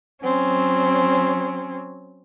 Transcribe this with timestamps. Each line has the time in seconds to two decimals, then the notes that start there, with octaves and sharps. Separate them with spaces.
0.22 F#3 C4 C#4